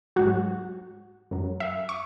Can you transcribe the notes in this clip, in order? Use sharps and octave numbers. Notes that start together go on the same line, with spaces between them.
G#2 F#3 F#4
F#2 F#3
E5
C#6